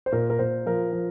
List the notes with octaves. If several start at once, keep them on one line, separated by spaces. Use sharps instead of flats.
C5
A#2 A#4
A#4
A#2 C5
F3 A#4
F3